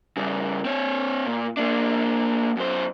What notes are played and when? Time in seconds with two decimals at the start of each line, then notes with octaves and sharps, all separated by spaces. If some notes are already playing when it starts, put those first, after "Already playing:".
0.17 C#3 G3
0.65 C4 C#5
1.26 A#2
1.57 A#3 D4
2.57 F#2 C5